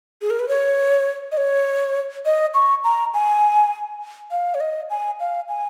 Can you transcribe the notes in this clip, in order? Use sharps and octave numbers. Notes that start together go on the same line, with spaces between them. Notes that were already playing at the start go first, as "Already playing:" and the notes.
G#4
A#4
B4
C#5
D#5
C#5
D#5
C#6
A#5
G#5
F5
C#5
D#5
G#5
F5
G#5